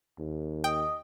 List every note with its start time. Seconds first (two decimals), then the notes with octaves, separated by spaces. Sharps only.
0.19 D#2
0.64 D#5 G5